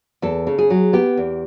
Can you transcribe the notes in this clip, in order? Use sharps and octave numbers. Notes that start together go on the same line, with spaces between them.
E2 A4
C#3
G#4
F#3
B3 G4
E2